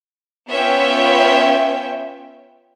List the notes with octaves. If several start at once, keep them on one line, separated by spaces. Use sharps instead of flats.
B3 C#4 F4 C#5 E5 G5